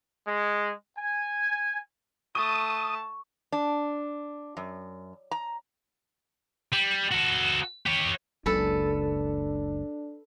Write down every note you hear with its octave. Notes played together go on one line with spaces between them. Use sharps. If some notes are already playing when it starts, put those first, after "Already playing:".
G#3
G#5
A3 A5 C#6 D#6
D4
F#2
A#5
G3
F#4 A4
G4 C#5
F#1 C#2 F#2 D4 A4 B4